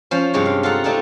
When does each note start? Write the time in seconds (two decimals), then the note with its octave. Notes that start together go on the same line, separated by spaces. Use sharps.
0.11 F3 C#4 C5
0.33 G2 C3 G#3 C#5
0.46 F5
0.63 F4 A4 F5 F#5 A#5
0.84 A3 C4 D4 D#4 F4